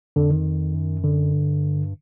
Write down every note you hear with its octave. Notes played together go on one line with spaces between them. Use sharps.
F2 D3
D#3
F#2
D3
G2